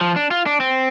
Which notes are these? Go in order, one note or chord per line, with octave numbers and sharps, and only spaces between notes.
F3
D4
F4
D4
C4